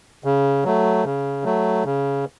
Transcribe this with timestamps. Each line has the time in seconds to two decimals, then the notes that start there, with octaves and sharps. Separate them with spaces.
0.24 C#3
0.64 F#3 A3
1.05 C#3
1.44 F#3 A3
1.85 C#3